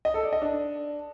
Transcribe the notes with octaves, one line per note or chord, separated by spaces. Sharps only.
D#5
A4
D5
D#5
D4